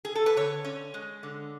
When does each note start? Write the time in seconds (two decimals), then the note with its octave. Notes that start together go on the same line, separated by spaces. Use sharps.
0.05 G#4
0.15 A4
0.26 B4
0.37 D3 C#5
0.65 C#4
0.94 G#3
1.23 D3